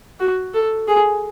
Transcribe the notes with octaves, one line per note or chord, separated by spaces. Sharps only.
F#4
A4
G#4